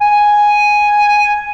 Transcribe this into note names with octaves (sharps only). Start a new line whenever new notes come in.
G#5